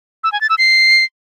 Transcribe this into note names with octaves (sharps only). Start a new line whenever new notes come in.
E6
G#5
A6
E6
C7